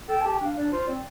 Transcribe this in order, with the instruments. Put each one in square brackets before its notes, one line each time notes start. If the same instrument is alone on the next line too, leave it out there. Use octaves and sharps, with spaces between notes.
[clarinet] A4 [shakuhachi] G5
[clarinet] G4 [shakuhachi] A5
[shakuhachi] G5
[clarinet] D4 [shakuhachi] F5
[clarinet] D4 [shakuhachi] D5
[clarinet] F4 [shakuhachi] C5
[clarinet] C4 [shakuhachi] D5